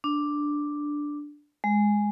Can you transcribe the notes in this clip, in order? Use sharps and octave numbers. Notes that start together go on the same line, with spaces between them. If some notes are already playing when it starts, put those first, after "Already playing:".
D4
G#3